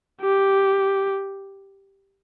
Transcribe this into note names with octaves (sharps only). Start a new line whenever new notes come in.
G4